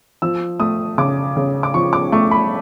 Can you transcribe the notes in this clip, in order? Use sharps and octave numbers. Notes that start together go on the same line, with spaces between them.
F3 E6
A3 D#6
C#3 D6
C#3
D6
F3 C#6
D6
A3 C#6
B5